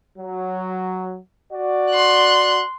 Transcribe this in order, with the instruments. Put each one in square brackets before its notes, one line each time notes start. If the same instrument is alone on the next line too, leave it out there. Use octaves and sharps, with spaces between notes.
[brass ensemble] F#3
F#4 D5
[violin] C6 F#6